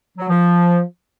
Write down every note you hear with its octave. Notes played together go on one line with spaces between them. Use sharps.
F#3
F3